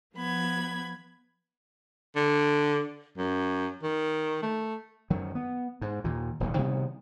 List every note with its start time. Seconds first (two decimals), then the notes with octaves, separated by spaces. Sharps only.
0.16 F3 B3 B5 G#6
2.16 D3
3.18 F#2
3.83 D#3
4.43 A3
5.10 F#2 D#3 F#3
5.35 B3
5.81 G#2
6.04 D#2 A#2
6.40 D#1 B1 F2 A#2
6.58 C3 D#3 G3 B3